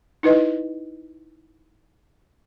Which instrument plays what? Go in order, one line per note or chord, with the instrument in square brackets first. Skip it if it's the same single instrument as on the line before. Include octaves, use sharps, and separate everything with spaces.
[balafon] D#4 E4 B4 D#5